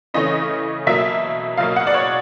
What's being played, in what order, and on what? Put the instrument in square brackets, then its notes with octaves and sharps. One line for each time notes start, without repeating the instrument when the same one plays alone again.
[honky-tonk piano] C#3 E3 A3 C#4 D#5
B2 F#3 A#3 E5
B2 F#3 A#3 F5
F#5
D5
C#5